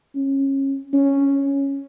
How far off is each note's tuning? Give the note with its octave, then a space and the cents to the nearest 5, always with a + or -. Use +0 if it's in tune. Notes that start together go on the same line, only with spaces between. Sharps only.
C#4 -25
C#4 +0